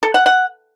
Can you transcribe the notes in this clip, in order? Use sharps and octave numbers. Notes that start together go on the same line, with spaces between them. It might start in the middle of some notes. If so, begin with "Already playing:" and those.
A4
F#5
F#5